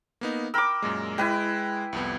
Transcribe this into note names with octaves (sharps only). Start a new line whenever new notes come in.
A#3 B3 D#4
A#4 G5 B5 D6 E6
F#2 A#2 G#3
G#3 E4 B4 G5
C2 F2 B3